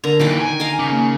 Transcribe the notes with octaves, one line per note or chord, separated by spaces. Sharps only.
D3 A#4 A#5
A#2 D#3 E3 G5 D6
D3 G#5
A#4 D#5 F5
C#3 D6
A#3